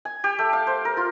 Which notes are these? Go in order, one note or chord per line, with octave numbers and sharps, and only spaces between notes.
G#5
G4
A3
F5
C5
A#4
F4